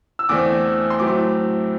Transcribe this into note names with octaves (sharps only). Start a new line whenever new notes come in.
E6
E2 D3 A3 C4 D6
C6
A2 F#3 A3 C4 D6